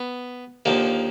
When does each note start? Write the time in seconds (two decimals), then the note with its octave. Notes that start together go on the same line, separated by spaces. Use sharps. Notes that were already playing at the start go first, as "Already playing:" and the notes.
Already playing: B3
0.65 D#2 D3 F3 A#3